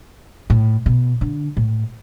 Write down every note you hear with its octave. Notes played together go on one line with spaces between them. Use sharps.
A2
B2
D3
A2